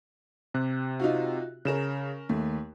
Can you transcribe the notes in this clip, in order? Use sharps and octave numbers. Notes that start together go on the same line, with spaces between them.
C3 G4 F#6
D#4 F4 F#4
C#3 C#4 A#4 E7
D#2 A3